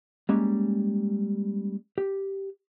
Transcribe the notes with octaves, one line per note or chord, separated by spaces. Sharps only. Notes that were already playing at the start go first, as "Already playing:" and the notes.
G3 G#3 A#3 C#4
G4